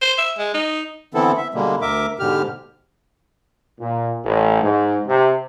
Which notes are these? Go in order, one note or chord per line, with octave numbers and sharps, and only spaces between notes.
C5
E5
G#3
D#4
D3 E3 B3 C4 E4 A4
E5
B2 D3 G3 G#3 A#3
D2 A#4 E5 D6
G#2 B2 D3 G4 F6
A#2
A1
G#2
C3